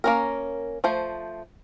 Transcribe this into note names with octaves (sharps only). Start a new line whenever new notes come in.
A#3 C#4 A#4
F3 A3 C5